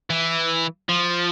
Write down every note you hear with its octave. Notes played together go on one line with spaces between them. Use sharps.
E3
F3